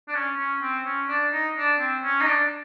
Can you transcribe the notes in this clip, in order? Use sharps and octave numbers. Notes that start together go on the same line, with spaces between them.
D4
C#4
C#4
C4
C#4
D4
D#4
D4
C4
C#4
D#4
D4